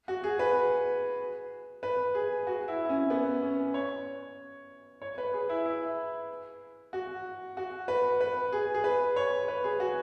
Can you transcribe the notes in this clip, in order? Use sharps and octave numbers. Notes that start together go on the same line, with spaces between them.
F#4
G#4
B4
B4
G#4
F#4
E4
E4
C#4
B3
C#4
C#5
C#5
B4
G#4
E4
E4
F#4
F#4
B4
B4
G#4
G#4
B4
C#5
B4
G#4
F#4